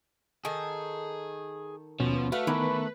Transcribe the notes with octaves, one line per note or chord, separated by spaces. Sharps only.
D#3 G#4 A4
D#2 B2 F3 C#4
A3 F#4 B4 F5
D#3 E3 B3 A#4